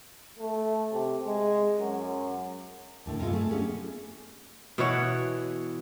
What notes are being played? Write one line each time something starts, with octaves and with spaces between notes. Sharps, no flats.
A3
C3
G#3
F#2
D#2 A2 D3
G2 C3 G#3 C4 F4
A3 G#4
B3 C#4 D4 G4 G#4
B2 E3 C#5 F#5